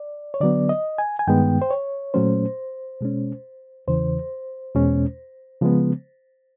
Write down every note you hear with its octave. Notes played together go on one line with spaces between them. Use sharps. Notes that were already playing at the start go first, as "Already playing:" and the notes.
Already playing: D5
C#5
D3 F#3 B3 D5
D#5
G#5
G#5
G2 D#3 G#3 B3 G5
C5
C#5
A#2 F#3 A3 C#4 C5
B2 G#3 C#4
E2 C#3 E3 C5
E2 B2 G#3 C#4
C#3 F3 G#3 B3